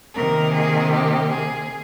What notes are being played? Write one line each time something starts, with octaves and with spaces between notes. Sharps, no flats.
C3 D#3 A#3 A#4
G#4
G4
G#4